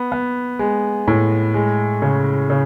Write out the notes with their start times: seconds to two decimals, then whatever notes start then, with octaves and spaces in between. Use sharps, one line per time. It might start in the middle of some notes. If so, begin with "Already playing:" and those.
Already playing: B3
0.12 B3
0.59 G#3
1.08 A2
1.54 G#3
2.02 C#3
2.50 C#3